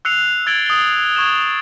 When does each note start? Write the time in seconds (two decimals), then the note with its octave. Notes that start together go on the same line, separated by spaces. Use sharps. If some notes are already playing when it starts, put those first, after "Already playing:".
0.05 E6 F#6 C7 C#7 F7
0.46 E6 G#6 A6 D7 F#7 G7
0.66 D#6 G7
1.15 C#6 G#6 E7 F7